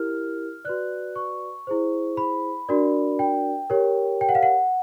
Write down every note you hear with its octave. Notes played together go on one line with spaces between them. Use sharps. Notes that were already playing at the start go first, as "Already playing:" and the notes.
Already playing: E4 G4 A#4 F6
F#4 B4 D5 F#6
C#6
E4 G#4 C5
B5
D4 F#4 A#4 D5
G5
G4 A#4 C#5
G5
F#5
F5
F#5